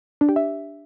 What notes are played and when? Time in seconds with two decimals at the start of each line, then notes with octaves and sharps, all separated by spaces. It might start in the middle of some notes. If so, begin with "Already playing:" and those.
0.21 D4
0.29 G4
0.36 E5